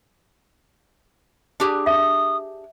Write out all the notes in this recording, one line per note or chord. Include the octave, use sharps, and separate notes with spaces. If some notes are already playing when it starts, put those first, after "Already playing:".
D4 G4 G#4
E5 D#6